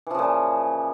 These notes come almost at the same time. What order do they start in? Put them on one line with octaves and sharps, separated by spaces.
E3 F3 C#3 A#2